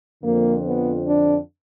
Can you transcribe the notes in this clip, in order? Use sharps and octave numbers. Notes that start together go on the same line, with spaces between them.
F2 D3 F3 A#3
B3
D4